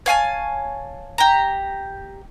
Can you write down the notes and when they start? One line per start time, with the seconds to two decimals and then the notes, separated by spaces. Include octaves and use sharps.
0.06 C#5 F5 G#5 A5
1.18 G4 A#5